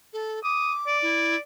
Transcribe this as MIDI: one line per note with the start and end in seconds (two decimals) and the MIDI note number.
0.13 0.42 69
0.44 0.98 86
0.44 0.72 87
0.87 1.38 74
1.02 1.36 64